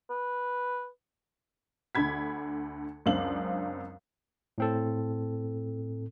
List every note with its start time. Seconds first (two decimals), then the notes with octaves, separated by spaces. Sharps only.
0.10 B4
1.95 D2 D3 B5 G#6 B6
3.06 C#2 F#2 C4 D4 F5 F#7
4.58 A2 C4 A4